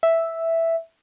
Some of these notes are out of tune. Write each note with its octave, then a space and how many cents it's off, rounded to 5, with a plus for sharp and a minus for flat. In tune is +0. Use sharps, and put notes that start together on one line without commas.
E5 +0